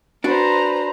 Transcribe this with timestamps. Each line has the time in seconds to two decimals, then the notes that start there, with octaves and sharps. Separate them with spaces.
0.24 D4 F#4 B4 C5 A#5